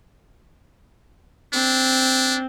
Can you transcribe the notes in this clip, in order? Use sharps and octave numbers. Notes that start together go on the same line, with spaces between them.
C4 D4